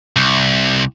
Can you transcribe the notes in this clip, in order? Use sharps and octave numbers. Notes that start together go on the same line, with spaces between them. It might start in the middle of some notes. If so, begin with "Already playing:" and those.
C2